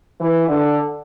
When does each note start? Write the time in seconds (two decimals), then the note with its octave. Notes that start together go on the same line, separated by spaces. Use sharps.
0.21 E3
0.49 D3